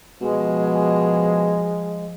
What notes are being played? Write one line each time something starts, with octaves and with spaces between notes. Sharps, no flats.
B2 F3 G#3